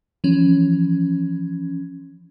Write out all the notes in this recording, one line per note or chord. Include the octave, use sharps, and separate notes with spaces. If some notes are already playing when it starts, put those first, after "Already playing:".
E3 F3 C#4